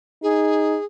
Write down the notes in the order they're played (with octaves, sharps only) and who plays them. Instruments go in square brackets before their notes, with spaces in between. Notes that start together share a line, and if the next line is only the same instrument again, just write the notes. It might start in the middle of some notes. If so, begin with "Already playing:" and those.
[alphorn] D#4 [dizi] G#4